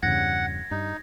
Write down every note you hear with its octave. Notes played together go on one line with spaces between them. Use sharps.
E2 G2 C#3 F#5 G#6 A#6
G2 D#4